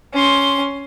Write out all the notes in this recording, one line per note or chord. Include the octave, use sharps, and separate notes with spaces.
C#4 C6